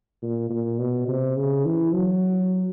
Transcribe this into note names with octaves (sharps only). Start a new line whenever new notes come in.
A#2
A#2
B2
C3
C#3
E3
F#3